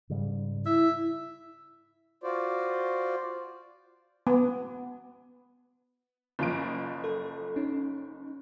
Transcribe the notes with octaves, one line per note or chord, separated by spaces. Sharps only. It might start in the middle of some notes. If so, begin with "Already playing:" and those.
G#2 C#3 G3
E4 E5
F4 F#4 C5 D5
B3
F#1 F3 D7
A4
C#4 D#4